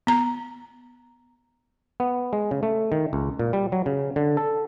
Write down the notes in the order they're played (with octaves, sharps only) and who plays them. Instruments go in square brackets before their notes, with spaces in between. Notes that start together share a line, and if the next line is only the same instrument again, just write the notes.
[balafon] B3 A#5
[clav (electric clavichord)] B3
G#3
C#3
A3
D#3
C#2
A#2
G3
F#3
C#3
D3
A4